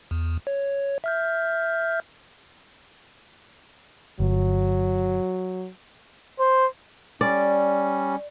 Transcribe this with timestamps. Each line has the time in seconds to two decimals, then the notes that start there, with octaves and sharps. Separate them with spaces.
0.11 E2
0.47 C#5
1.04 E5 F6 G6
4.20 G1 F#3
6.39 C5
7.21 G3 C#4 D5